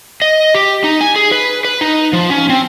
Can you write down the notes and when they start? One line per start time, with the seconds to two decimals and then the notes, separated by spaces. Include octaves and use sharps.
0.22 D#5
0.55 G4
0.84 D#4
1.01 G#5
1.16 G#4
1.31 B4
1.65 B4
1.81 D#4
2.13 F3
2.30 C#4
2.49 C4